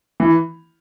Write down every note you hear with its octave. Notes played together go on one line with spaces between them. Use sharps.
E3